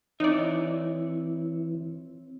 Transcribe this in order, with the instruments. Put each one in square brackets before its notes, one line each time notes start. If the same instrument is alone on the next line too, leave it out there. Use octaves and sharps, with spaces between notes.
[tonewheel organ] E3 [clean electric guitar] C4 C#5 E5 [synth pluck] D#4 D5